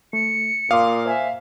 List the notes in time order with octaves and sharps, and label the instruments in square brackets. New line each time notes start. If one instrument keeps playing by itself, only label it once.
[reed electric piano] A3 [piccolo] C#7
[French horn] A#2 [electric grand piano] F5 [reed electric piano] C6 D6 D#6
[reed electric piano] C5 G#5 [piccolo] E5